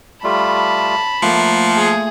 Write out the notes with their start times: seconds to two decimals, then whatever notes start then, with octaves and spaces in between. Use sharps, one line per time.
0.24 G3 A3 F4 A5 B5
1.23 F3 A3 A#3 F4 F#5
1.77 G#4 A5